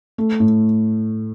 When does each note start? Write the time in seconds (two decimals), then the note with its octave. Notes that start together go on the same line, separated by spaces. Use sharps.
0.18 A3
0.40 A2